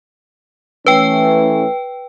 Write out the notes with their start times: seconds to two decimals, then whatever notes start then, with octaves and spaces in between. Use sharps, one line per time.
0.87 E3 A3 C#4 B4 G5